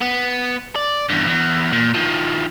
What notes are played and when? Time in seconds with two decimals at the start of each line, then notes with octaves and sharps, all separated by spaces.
0.01 B3
0.76 D5
1.10 E2 G2
1.28 E2
1.73 A#2
1.94 D#3 F3